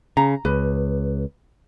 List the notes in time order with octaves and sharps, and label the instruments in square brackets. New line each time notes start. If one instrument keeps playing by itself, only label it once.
[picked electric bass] C#3 [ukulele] A#5
[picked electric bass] C#2 [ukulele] B4